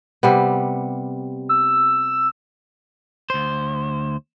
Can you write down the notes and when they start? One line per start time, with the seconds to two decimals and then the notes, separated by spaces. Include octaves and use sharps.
0.23 C3 G3 B3
1.49 E6
3.30 D2 C5